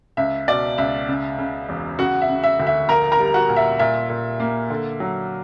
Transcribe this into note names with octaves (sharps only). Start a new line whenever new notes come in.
C#2 E5
B2 D5
C#2 E5
C#3
C#3
E1
C#3 F#4 F#5
E5
C#3
E5
D2
E5
A#1 A#4 A#5
A#4 A#5
G3
F#4 F#5
A#2
E5
A#2 E5
A#2
A#3
D3
F#3